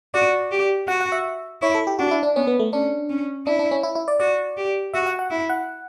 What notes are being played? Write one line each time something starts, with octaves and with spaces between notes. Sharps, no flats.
F#4 D5
G4
F#4 F#5
F#5
E5
E4 C#5
A4
G4
D4 F#4
E4
D4
B3 C#4
B3
A3
C#4 D4
C#4
D4 E4
D4
C#4
E4
E4
D5
F#4 D5
G4
F#4 E5
F#5
F#5
E4
F#5